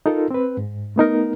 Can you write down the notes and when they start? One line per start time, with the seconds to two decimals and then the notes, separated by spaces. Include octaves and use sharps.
0.06 D#4 F4 A4 A#4
0.30 C4 B4
0.57 G#2
0.96 A3 B3 D#4 A#4